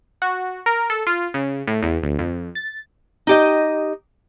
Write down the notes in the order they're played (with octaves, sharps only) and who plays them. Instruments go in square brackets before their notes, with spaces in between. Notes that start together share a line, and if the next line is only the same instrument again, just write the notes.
[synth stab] F#4
A#4
A4
F4
C#3
A2
E2
D2
F2
A6
[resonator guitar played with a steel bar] D#4 G4 D#5